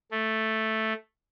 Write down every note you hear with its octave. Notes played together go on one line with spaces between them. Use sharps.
A3